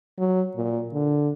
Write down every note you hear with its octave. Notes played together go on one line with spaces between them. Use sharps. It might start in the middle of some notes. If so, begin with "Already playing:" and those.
F#3
A#2
D3